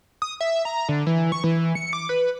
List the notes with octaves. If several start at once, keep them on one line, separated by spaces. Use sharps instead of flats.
D#6
E5
A#5
D3
E3
C#6
E3
C#7
D6
B4